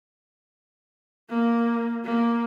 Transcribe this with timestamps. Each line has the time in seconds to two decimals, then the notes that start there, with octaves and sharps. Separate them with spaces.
1.30 A#3
2.05 A#3